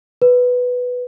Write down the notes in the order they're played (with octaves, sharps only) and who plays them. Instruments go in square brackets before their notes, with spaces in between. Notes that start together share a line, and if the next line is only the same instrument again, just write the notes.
[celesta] B4